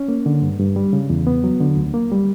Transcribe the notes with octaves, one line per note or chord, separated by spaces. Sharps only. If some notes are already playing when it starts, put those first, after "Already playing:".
Already playing: C#4
A#3
D3
G2
G2
G3
C#3
E2
B3
F#3
D3
D2
A#3
G3